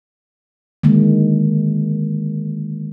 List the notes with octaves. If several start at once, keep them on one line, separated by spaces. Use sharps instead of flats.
D3 D#3 G#3 A#3